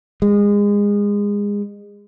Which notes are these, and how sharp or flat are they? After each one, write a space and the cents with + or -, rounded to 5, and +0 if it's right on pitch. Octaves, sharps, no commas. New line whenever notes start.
G#3 -25